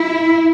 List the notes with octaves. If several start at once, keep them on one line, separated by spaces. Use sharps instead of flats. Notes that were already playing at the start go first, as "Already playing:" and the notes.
Already playing: E4